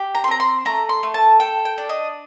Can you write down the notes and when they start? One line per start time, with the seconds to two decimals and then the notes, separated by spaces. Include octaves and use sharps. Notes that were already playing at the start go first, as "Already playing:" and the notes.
Already playing: G4
0.15 A#5
0.24 C6
0.28 C4 A#5
0.40 C6
0.65 A3 A#5
0.89 C6
1.03 A3
1.14 A5
1.40 A4 G5
1.65 G5
1.78 D4
1.89 D#5